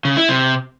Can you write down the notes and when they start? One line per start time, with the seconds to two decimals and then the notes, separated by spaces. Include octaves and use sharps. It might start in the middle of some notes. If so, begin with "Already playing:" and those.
0.05 C#3
0.17 E4
0.29 C3